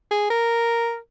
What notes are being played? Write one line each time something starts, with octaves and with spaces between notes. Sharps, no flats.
G#4
A#4